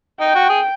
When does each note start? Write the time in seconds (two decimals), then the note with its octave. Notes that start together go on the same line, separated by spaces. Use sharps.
0.20 D#4 G5
0.35 F#4
0.49 G#4